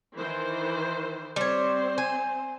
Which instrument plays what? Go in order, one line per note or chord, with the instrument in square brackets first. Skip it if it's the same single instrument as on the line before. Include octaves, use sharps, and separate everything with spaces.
[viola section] D#3 E3 C5
[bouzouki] G3 C#5 [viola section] C4 C5
[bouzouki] G#5